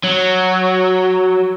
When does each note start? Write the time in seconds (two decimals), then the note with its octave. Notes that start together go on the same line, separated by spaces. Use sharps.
0.04 F#3